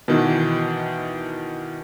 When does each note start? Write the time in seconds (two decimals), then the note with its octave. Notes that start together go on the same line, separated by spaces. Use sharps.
0.08 B2 D#3 E3